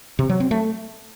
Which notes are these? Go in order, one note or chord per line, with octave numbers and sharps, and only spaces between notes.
C3
F#3
C4
A3